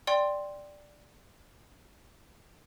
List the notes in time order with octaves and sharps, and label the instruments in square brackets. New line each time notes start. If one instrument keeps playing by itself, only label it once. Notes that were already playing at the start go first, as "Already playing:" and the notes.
[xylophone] D5 G5 C6